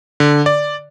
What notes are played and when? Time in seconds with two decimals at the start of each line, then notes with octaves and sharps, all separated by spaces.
0.20 D3
0.46 D5